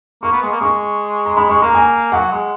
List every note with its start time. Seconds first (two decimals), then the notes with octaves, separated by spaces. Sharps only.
0.23 A#3 C#6
0.32 B3
0.42 G#3
0.52 A#3
0.60 G#3 C#6
1.25 A#5
1.36 G#3 B5
1.50 G#3 C#6
1.62 A#3 A#5
1.74 G#5
2.12 F#3 F#5
2.32 G#3